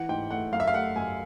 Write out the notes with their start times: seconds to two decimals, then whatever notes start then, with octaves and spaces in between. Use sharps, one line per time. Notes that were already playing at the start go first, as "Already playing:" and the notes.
Already playing: E3 F#5
0.09 G#2 G5
0.31 A3 F#5
0.52 F#2 F5
0.60 E5
0.68 F5
0.74 A3 F#5
0.96 F#2 G#5